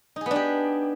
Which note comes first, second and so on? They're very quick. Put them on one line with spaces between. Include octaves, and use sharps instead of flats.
D#4 G#4 B3 D4 G4